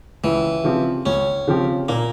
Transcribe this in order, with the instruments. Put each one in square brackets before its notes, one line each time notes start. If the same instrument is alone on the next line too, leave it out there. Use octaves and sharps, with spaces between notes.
[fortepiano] C#2 [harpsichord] E3
[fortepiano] C#3 F3 C4 G4
[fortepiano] C#2 [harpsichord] C#4
[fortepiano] C#3 F3 C4 G4
[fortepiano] A#2 [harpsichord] A#3